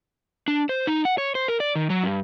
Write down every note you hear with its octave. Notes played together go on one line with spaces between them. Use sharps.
D4
C5
D#4
F#5
C#5
C5
A#4
D5
D#3
F#3
G2